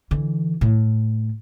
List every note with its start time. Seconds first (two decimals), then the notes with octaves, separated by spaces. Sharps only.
0.11 D3 E3
0.61 A2